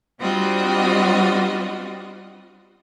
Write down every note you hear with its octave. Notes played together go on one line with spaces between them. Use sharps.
G3 C4 D4 F4 F#4 D#5